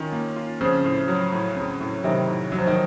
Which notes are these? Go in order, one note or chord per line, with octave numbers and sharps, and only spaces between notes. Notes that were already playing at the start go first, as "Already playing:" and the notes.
Already playing: D#3 C#4 F4
A#3
F4
C#3 F3 C4
A2
F#3
A2
C#3 C4
A2
C3 D#3 F#3
A2
F#3 D#4
F3
D#3